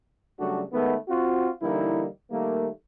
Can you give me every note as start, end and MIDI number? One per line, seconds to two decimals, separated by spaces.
0.40 0.62 49
0.40 0.62 54
0.40 0.62 55
0.40 0.62 57
0.40 0.62 62
0.40 0.62 66
0.73 0.95 51
0.73 0.95 56
0.73 0.95 57
0.73 0.95 59
1.08 1.49 60
1.08 1.49 65
1.08 1.49 66
1.62 2.05 50
1.62 2.05 52
1.62 2.05 55
1.62 2.05 58
1.62 2.05 63
1.62 2.05 64
2.31 2.68 51
2.31 2.68 55
2.31 2.68 57
2.31 2.68 58